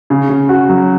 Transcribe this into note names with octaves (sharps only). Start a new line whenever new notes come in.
C#3
C#3
F#4
F#3